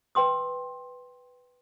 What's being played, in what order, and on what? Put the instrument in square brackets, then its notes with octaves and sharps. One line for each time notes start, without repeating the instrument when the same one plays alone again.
[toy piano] B4 G5 C6 D#6